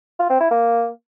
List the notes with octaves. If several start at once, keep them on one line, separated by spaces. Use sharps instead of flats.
F4
C4
E4
A#3